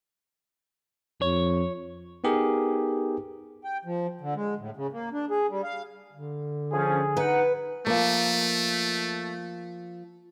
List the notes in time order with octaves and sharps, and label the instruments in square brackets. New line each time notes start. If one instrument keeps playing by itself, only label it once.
[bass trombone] F2 [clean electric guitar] C#5
[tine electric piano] B3 D#4 G4 G#4 A#4
[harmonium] G5
F3
D3
G#3
A2
C#3
A#3
D4
G#4
G3
F5
[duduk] D3
[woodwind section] F3 C#4 [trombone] G#4
[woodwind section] D#4 F#5 [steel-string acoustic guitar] B4
[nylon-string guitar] F3 A#3 [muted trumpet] A3